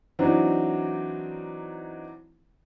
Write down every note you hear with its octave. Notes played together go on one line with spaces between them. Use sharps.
E3 F#3 C4 D4 D#4